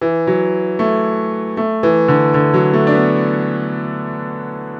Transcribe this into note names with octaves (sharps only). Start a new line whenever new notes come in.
E3
F#3
A3
A3
E3
D3
D3
F#3
A3
D4
B3